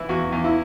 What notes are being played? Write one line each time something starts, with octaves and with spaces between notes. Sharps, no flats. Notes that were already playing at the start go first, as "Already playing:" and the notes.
Already playing: E3 E4
E2 F#4
E2
E4